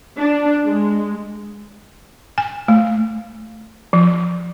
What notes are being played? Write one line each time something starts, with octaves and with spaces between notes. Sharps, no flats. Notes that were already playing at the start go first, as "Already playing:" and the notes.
D4
G#3
G#5
A3
F3